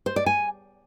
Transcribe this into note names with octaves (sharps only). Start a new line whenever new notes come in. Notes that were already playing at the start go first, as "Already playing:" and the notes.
C5
D5
G#5